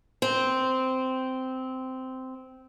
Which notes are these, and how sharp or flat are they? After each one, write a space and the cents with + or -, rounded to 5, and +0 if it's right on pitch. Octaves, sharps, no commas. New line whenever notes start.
C4 -10